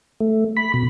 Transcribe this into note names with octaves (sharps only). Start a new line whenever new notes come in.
A3
B5
B2